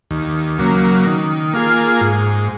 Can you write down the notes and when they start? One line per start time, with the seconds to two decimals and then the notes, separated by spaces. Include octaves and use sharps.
0.11 D#2
0.59 C#3 F#3 A#3
1.06 D#3
1.53 A#3 F4 G#4
2.01 G#2